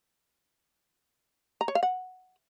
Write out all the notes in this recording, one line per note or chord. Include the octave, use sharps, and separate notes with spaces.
A#5
C#5
F5
F#5